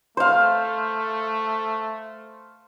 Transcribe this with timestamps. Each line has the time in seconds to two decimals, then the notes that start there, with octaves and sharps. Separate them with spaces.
0.17 A3 C5 F5